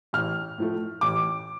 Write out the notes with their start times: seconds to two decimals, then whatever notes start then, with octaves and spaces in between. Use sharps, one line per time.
0.13 A1 F6
0.58 A2 F3 A3
1.01 A1 D6